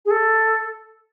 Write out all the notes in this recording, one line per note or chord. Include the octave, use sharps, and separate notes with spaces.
G#4
A4